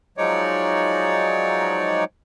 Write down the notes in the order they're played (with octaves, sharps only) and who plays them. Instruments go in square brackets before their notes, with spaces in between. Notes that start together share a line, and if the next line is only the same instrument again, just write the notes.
[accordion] F3 F#3 G#3 D#4 C#5 D5